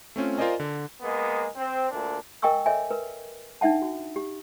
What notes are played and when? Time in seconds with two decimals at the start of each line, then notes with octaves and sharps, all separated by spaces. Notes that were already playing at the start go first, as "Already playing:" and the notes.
0.16 A3 C4 C#4 F4
0.38 F4 A#4 C5 D5 D#5 G#5
0.60 D3
1.02 G#3 A#3 B3
1.56 C4
1.90 D2 A#2 D4
2.42 A#4 D#5 G5 G#5 C#6 E6
2.66 A4 C#5 D#5 E5 G#5
2.90 A#4 B4
3.61 D4 D#4 E5 F#5 A5
3.82 F#4
4.16 G4